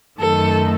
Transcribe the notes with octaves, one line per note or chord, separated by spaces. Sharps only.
F#2 D#3 A3 A4